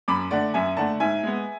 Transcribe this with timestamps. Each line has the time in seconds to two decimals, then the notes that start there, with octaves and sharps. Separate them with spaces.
0.08 F#2 B5 D6
0.31 D3 A3 D5 F#5
0.54 F#2 E5 G#5
0.77 D3 A3 F#5 A5
1.00 G#2 E5 G#5
1.23 G#3 B3